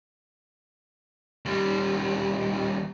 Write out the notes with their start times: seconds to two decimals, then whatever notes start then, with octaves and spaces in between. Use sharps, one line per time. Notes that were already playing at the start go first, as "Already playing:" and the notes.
1.46 D#2 G3